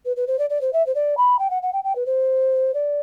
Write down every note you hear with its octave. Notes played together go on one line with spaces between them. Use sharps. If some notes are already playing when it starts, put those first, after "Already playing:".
B4
B4
C5
D5
D5
C5
E5
C5
D5
B5
G5
F#5
F#5
G5
G5
B4
C5
D5